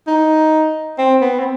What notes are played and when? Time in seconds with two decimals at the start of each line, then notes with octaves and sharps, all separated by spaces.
0.07 D#4
0.98 C4
1.21 B3
1.39 C4